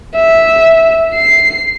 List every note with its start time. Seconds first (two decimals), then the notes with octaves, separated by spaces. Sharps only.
0.15 E5
1.14 C7